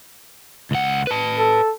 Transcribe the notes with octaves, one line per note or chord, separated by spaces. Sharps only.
C#2 F#5
B4 A5
A4